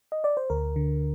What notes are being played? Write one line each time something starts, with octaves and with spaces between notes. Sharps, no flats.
D#5
D5
C5
D2 A#4
D3